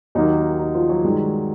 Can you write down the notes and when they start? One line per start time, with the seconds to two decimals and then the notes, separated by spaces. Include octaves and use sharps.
0.15 D#2 D#3 F#3 A#3 D#4
0.59 D#4
0.74 F3 F4
0.89 F#3 F#4
1.04 G2 D#3 G#3